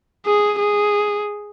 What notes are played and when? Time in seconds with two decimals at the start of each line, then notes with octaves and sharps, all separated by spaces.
0.26 G#4
0.59 G#4